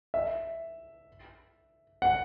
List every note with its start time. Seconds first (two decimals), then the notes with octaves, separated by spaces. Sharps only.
0.14 E5
2.02 F#5